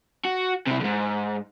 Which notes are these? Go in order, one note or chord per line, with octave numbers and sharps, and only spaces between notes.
F#4
C3 E4
E2 G#2